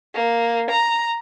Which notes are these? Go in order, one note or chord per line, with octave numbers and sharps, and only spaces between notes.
A#3
A#5